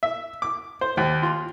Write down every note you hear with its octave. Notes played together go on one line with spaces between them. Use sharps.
E5
D6
C5
D#2
F4